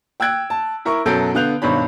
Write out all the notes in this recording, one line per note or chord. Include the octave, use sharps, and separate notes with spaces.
G5 E6 F#6 G#6 D7
A5
E4 A#4 C#6
F#2 B2 F#3 A4 G6 D7
D3 B3 F5 F#6 G6 F7
G#1 G2 B2 C#5 B5